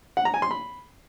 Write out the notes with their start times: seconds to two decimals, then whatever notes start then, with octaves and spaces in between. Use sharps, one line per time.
0.17 F#5
0.25 A#5
0.34 G#5
0.42 C6
0.51 B5